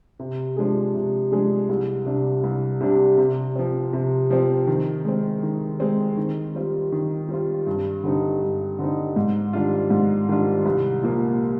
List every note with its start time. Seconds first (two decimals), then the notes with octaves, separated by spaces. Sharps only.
0.19 C3
0.57 F3 G#3 D4 G#4
0.94 C3
1.32 F3 G#3 D4 G#4
1.69 C2
2.06 C3 G3 D4
2.44 C2
2.81 C3 G3 D4
3.18 C3
3.56 F3 C4
3.93 C3
4.30 F3 C4
4.67 D#3
5.05 G#3 C4
5.43 D#3
5.80 G#3 C4
6.17 D#3
6.55 G3 C4 F4
6.92 D#3
7.29 G3 C4 F4
7.67 G2
8.04 D3 G3 C4 D#4
8.41 G2
8.79 D3 G3 C4 D#4
9.16 G#2
9.53 D#3 G3 D4 F4
9.90 G#2
10.28 D#3 G3 D4 F4
10.65 C2
11.03 A#2 F3 A#3